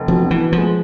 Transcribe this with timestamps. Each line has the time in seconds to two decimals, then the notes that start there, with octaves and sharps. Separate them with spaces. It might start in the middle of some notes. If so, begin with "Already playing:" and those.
Already playing: F1
0.08 B2 F3
0.24 B2
0.31 E3
0.41 B3
0.52 F3
0.58 G#3